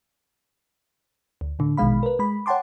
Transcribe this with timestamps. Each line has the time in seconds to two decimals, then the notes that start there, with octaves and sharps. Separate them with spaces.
1.41 D2
1.59 A2 D3
1.77 A#1 B2 D#3 G#3 F5 B5
2.03 A#4 B4
2.19 G#3 B5
2.46 C#5 F#5 G5 A5 C6 D6